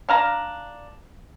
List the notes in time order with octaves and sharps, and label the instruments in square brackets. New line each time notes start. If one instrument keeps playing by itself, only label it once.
[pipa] D4 F5 A#5